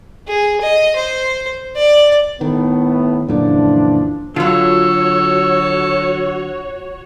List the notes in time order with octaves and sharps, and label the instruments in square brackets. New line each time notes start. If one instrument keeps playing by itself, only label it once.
[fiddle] G#4
D#5
C5
D5
[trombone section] A2 A3 B3 [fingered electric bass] D#3
[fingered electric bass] F#2 A#2 D3 [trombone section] E3 F3 D4
[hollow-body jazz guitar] D3 F#3 [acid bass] F4 [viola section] F#4 C#5 [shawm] A4